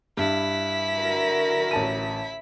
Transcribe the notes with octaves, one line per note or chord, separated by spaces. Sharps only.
G2 E4 B6
D3 F#4 A#4
A1 A5 D#7